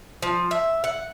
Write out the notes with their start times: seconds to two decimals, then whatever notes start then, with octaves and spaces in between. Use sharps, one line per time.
0.22 F3
0.51 E5
0.84 F#5